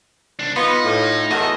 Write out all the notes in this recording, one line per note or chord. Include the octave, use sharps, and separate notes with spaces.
C2 D4
B3 D#4 F4
A2
E2 A3 F#4 A#4 D#5 F5